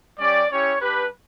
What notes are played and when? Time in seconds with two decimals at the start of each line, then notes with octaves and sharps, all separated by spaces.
0.19 G3 C#4 G4 D5
0.50 C#4 E4 G4 C#5
0.80 G3 D4 G4 B4